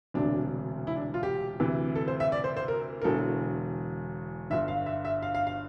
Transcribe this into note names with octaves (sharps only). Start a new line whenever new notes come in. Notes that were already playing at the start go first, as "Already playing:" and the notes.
E1 D2 C3 D4
E4
D4
F4
G4
D2 C3 E3
A4
C5
E5
D5
C5
C5
A#4
A#4
E1 E2 D3 A4
G1 G2 D3 E5
F5
E5
E5
F5
F5
F5